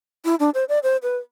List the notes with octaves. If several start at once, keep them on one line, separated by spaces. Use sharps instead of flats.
E4
D4
C5
D5
C5
B4